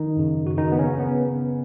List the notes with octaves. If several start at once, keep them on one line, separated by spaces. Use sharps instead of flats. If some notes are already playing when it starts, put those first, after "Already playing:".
Already playing: D#3 D#4
F#2 C#3
F#4
D#3 D#4
B3
C#3 C#4
C#3 B3